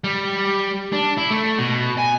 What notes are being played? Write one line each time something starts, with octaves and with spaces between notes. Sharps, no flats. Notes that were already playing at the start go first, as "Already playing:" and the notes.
G3
D4
E4
A3
B2
G#5